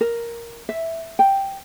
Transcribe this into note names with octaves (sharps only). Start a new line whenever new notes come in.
A#4
E5
G5